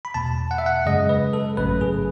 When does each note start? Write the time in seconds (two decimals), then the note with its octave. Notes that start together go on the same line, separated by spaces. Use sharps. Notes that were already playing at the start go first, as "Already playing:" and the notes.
0.05 B5
0.14 E2 B2 A3 A5
0.51 F#5
0.58 E5
0.66 F#5
0.86 F#2 C#3 G#3 D#5
1.09 B4
1.33 A4
1.57 A1 G#2 F#3 A3 C#4 B4
1.81 G#4